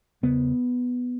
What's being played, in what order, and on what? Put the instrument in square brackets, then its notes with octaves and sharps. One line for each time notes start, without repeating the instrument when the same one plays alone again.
[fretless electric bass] E2 C#3 B3